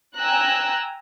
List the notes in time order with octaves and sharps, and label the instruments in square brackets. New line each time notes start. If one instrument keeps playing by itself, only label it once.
[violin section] G5 G#5 A#5 E6 F#6